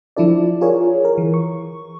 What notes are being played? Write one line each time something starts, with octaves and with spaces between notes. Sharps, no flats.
F3 D4 E4 A4 D5
F4 G#4 A#4 C#5
A#4
E3
C#6